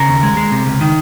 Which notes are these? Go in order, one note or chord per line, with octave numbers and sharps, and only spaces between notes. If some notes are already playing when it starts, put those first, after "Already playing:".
Already playing: C#3 A#4
D#2
G#3
G#3
C3
C#2
D#3